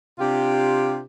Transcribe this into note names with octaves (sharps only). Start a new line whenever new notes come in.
C3 D4 F4 G4